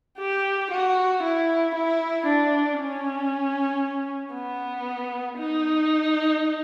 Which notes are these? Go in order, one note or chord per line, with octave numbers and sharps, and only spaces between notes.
G4
F#4
E4
E4
D4
C#4
B3
D#4